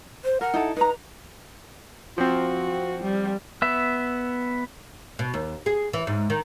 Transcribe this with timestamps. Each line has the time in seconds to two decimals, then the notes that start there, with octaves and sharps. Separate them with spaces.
0.24 C5
0.41 A#4 F#5
0.54 D#4 E4 A4
0.76 D#4 B4 A#5
2.18 F3 C4 F#4
3.03 G3
3.62 B3 E5
5.19 B2
5.34 D#2
5.66 G#4
5.93 E3
6.07 G#2
6.30 D#3